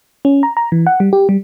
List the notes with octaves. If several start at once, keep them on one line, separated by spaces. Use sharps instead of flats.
C#4
A#5
A#5
E3
F#5
G3
G4
G3